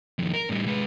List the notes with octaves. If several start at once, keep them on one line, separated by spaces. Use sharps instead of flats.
F2 D#3
A#4
A2 G3
G#3 B4